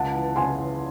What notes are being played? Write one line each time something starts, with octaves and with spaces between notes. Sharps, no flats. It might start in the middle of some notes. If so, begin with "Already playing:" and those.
Already playing: C#2 F#5 A5
E3
C#3 G#5 C6
E3